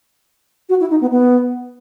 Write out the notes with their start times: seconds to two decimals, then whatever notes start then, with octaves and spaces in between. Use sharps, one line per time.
0.69 F#4
0.80 E4
0.90 D#4
1.01 B3
1.11 B3